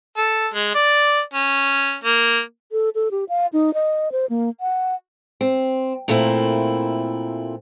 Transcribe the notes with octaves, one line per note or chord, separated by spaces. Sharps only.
A4
G#3
D5
C#4
A#3
A4
A4
G4
F5
D#4
D#5
C5
A#3
F#5
C4
A#2 A3 A#3 C4 E4